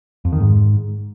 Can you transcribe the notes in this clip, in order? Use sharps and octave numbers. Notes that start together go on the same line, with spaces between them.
F2
D#3
G#2